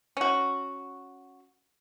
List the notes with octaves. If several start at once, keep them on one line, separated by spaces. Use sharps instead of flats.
C#4 F#4